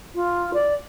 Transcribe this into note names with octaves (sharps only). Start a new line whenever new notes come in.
F4
D5